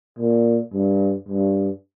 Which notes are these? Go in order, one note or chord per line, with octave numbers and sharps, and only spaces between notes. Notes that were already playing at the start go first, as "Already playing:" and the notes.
A#2
G2
G2